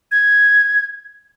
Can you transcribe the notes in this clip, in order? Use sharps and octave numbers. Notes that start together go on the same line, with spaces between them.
G#6